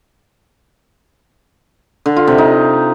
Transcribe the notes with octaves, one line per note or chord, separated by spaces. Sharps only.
D3
F4
C3
D#4